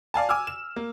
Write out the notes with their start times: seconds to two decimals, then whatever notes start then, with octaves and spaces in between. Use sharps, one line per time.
0.14 D5 F5 G#5 A5
0.29 G#5 D6 E6 F6
0.47 E7
0.76 A#3